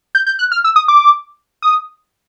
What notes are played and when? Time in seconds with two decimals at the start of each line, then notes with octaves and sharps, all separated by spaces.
0.15 G6
0.26 G6
0.39 F#6
0.52 F6
0.64 E6
0.76 D#6
0.88 D6
1.62 D#6